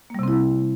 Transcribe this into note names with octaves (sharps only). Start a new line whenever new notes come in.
C3 G3 A#3 C4 E4